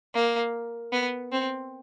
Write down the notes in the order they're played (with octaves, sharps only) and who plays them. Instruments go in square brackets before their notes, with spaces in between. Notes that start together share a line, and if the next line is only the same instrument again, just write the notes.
[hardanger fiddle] A#3
B3
C4